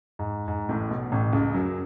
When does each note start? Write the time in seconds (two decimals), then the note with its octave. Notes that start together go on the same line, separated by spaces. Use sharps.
0.19 G#2
0.48 G#2
0.69 A1 A2
0.90 B1 B2
1.12 A1 A2
1.33 C#2 C#3
1.54 F#2 F#3